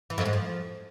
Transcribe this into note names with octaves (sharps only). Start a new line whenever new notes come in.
E3
F2
G#2
F3